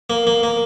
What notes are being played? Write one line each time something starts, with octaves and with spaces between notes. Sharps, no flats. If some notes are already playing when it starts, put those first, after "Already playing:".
A#3
A#3
A#3